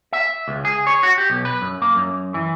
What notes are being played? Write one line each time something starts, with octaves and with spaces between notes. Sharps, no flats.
E5
C#2
G#4
C#5
F#4
G4
B1
B4
F#2
A#3
F#2
E3